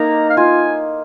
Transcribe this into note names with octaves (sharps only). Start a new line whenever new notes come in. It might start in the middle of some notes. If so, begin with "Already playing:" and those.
Already playing: A#3 D#4 A#5
F5
F4 G#5